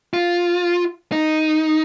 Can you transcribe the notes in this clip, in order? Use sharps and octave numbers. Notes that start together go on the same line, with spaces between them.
F4
D#4